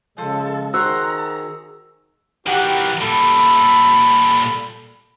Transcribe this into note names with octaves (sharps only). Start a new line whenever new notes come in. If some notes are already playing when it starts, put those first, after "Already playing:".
C#3 F3 G#3 A4
D#3 F#4 G#4 C5 A#5 E6
D#3 E3 F#4 G4 F#5
A#2 G3 A4 B5